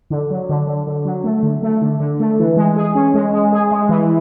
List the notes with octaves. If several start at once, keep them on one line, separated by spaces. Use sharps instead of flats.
D3
F#3
D3
D3
D3
F#3
A3
D3
A3
D3
D3
A3
E3
G#3
G#4
C#4
G#3
G#3
G#4
G#3
E3